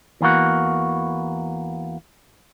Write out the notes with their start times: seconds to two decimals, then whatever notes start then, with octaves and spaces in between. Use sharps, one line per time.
0.21 E2 E3 A#3 F#4